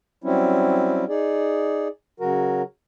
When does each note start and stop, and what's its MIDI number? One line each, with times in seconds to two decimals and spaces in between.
0.24 1.05 54
0.24 1.05 55
0.24 1.05 60
0.24 1.05 61
0.24 1.05 64
1.09 1.88 63
1.09 1.88 68
1.09 1.88 74
2.20 2.62 49
2.20 2.62 54
2.20 2.62 66
2.20 2.62 70